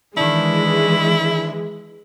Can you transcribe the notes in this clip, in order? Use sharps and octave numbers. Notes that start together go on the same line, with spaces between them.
D#3 E3 G#3 D4 E4